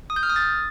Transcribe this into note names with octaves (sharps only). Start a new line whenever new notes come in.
D#6
G6
F6
D#6
A6